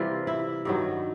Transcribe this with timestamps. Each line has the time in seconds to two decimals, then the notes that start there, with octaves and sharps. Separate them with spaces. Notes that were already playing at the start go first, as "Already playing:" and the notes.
Already playing: C3 E3 G3 F4
0.27 E4
0.65 G2 D#3 F#3